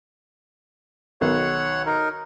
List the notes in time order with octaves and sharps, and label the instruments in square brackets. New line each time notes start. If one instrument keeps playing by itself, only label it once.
[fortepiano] B1 D#3 [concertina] C#5 F#5
[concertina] D#4 A#4